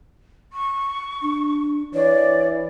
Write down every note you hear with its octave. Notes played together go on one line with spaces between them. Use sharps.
C#6
D4
E3 C#5 D5